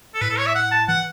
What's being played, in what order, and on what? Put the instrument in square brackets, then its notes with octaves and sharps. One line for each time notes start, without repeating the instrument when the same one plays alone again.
[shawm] A4
[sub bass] A2 [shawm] B4
[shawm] A4
C#5
E5
F#5
A5
[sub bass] E3 [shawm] F#5